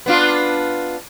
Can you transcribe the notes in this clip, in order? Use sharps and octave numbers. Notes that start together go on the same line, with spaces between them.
B3 D4 F4